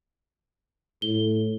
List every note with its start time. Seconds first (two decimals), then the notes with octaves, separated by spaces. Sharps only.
1.02 A2 G7